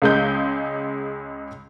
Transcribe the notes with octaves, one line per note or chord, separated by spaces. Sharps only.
C#2 G#3 G6